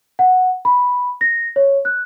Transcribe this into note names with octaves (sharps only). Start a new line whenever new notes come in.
F#5
B5
A#6
C#5
F#6